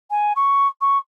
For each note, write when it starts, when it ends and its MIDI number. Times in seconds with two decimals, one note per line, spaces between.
0.10 0.32 80
0.36 0.67 85
0.81 0.97 85